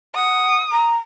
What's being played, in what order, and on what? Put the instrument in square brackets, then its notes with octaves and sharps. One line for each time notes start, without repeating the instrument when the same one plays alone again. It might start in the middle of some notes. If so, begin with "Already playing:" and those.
[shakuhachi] F#5 [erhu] D#6
[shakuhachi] A#5